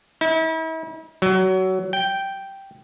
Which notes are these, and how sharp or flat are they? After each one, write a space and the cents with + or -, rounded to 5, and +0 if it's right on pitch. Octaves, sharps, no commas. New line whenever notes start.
E4 -40
F#3 +20
G5 -5